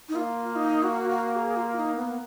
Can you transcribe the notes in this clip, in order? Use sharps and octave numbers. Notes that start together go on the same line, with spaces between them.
D#4
A#3 F4
D#4
F#4
F#4
G#4
F4
D#4
B3